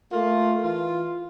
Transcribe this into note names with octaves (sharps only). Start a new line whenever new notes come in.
A3 A#3 F4
E3 F4